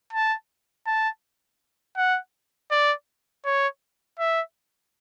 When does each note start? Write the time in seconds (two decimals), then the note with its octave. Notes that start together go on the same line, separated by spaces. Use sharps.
0.13 A5
0.87 A5
1.97 F#5
2.71 D5
3.45 C#5
4.19 E5